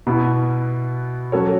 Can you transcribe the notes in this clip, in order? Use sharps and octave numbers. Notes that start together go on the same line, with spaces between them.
B2 B3 E4
F#3 C#4 F#4 A4 C#5